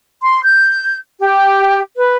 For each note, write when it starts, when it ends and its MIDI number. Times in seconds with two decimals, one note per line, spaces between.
0.22 0.42 84
0.43 0.97 91
1.20 1.81 67
1.97 2.17 71